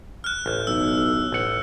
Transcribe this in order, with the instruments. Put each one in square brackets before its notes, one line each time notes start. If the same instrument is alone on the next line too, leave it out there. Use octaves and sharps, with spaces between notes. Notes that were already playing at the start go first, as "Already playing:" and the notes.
[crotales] F6 F#6
[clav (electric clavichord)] A1
[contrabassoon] B1 [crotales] E6
[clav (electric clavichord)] A1 F#5